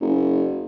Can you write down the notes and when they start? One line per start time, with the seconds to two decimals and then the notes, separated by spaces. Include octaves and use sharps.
0.01 F#1